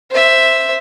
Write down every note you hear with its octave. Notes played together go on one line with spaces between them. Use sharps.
C5 E5